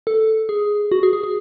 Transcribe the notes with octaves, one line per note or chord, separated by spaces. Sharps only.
A4
G#4
F#4
G#4
G#4
G#4